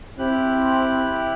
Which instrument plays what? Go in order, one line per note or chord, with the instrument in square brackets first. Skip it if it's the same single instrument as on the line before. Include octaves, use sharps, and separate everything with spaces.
[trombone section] C4 [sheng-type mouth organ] E4 G4 F#6